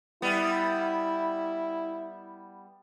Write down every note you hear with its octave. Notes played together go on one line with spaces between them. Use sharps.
G3 B3 E4